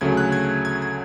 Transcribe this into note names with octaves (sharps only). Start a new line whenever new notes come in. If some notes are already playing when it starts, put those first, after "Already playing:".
D2 C#3 F#3 A3 G#6
F#6
G#6
G#6
G#6